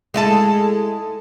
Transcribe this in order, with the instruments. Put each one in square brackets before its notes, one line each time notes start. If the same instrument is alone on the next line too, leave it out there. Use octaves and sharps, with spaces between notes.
[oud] G#3 E4 A4